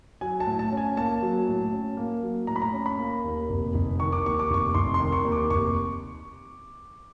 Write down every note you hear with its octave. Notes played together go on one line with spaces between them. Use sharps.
F#3 G#5
A5
A2
A5
C#4
G#5
A#3 A5
F#3
A2
C#4
A#3
F#3
A2 A#5
B5
A#5
C#4
B5
A#3
D#2
F1
F1
D#3 C#6
D6
D#2 C#6
D6
F1 C#6
F1 C6
C6
D#3
C#6
D#2
D6
F1 C#6